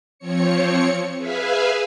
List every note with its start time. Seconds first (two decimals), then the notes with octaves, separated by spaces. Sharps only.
0.19 F3 C4 C#5 C#7
1.17 G#4 B4 E5 F5 G#5